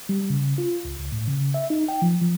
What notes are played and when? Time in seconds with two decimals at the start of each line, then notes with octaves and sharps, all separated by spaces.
0.09 G3
0.30 C#3
0.58 F4
0.85 C#2
0.99 C#2
1.12 A2
1.28 C#3
1.54 E5
1.70 D#4
1.88 G5
2.02 F3
2.21 F3